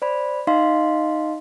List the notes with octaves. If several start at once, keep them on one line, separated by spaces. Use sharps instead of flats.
C5 D5 B5
D#4 D#5 F5 C6